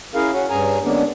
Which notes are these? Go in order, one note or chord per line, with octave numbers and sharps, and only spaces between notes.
C#4 E4 G#4 A#4 F5
C#4 F#4
G2 C#4 G#4 G#5 A#5
D3 G#3 A#3 B3 C#4 D4